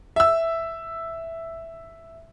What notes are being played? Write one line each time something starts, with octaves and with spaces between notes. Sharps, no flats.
E5 E6